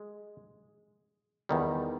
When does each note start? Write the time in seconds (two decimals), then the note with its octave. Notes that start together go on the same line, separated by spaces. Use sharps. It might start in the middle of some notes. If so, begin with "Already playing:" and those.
Already playing: G#3
1.49 E2 D#3 G3